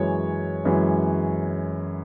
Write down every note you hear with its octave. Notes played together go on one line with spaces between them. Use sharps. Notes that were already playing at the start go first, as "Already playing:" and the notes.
Already playing: F#2 E3 G#3 C#5
F#2 E3 G#3